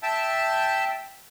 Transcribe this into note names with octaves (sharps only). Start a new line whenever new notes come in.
E5 G5 A5